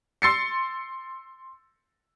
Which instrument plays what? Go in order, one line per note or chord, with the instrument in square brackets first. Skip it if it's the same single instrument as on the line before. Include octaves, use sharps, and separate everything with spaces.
[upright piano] C6 E6 A6 C7 C#7